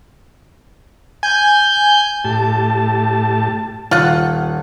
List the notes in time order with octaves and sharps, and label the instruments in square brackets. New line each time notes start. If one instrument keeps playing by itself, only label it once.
[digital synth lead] G#5 [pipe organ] G6
[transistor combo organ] A2 G4 A5
[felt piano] D#1 [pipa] F4 F#5